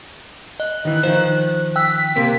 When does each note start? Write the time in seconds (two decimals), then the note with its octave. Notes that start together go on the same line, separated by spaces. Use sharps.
0.60 D#5 F#6
0.85 D#3 E3
1.03 D#3 F3 C5
1.76 G5 E6 F#6 B6
2.16 C3 A#3 C4